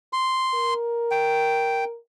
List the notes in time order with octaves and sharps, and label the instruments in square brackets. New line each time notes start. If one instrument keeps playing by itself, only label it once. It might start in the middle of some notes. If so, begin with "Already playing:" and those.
[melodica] C6
[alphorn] A#4
[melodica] G5